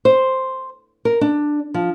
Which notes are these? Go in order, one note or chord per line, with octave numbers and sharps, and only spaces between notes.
C5
A#4
D4
F3